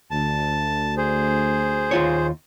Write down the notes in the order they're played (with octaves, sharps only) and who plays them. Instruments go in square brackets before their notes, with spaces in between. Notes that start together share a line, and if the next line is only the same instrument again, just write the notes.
[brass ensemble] D2 [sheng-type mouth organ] A5
[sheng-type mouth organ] G#4 C5
[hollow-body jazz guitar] D#2 F4 C#5